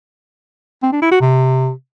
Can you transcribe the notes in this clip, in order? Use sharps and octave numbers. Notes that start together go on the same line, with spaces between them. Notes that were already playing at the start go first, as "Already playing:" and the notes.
C4
D4
E4
F#4
C3